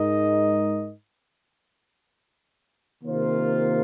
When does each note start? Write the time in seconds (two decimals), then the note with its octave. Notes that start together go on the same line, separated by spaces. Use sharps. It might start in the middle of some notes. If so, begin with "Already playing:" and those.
Already playing: G#2 G#3 D#4 A#4 D#5
3.02 C3 D#3 A#3 F4 C5